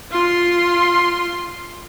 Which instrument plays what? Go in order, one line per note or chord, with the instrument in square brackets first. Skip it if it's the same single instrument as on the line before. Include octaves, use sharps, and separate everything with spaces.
[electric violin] F4 C6